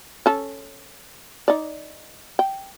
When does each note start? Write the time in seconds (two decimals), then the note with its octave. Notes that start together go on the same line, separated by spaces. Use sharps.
0.26 C#4 A4
1.48 D#4 D5
2.39 G5